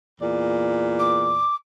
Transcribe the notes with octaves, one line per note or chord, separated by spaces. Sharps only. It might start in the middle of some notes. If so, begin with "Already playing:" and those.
E2 A#2 D5
D6